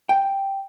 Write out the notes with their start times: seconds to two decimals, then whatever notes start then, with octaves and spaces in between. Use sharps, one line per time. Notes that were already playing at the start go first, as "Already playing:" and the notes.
0.09 G5